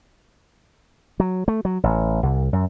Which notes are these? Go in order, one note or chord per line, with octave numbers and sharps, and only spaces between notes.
F#3
A3
F#3
A1
C2
F#2